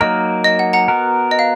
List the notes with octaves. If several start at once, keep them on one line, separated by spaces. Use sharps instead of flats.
F#3 A#3 D#4 A#4 D#5
D#5
F#5
F#5 A#5
B3 F#4 A#4
D#5
F5